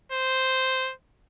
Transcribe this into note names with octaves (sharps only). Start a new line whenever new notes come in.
C5